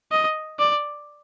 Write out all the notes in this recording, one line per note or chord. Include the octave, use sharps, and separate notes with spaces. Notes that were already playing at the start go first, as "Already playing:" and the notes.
D#5
D5